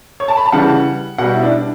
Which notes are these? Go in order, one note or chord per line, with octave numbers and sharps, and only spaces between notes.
C#5
A5
B5
A5
C#3 E3 G3 F#5
B2 G3 F#5
E4
D4